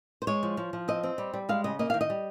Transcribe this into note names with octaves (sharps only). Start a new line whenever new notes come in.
C5
G#3 C#5
F3
F3
F3
C4 D#5
C4
G3
G3
G#3 F5
C#3 D#5
A#3 D#5
D#3 F5
D#5
G3